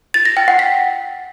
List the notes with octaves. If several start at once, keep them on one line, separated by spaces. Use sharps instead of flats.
A6
A#6
G5
F#5
B6